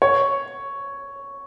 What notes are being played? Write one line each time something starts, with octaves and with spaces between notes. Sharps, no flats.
C#5